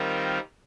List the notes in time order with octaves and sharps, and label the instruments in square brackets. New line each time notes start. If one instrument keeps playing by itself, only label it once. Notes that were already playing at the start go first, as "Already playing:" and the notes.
Already playing: [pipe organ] D#3 G3 C4 F4 A#4